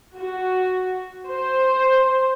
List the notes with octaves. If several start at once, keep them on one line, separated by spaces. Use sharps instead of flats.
F#4
C5